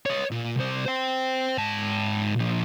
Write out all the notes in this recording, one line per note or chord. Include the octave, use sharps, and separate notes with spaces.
C#5 D#5
A#2
C2 C5
C5 G5
G#2 A5
A#2 F3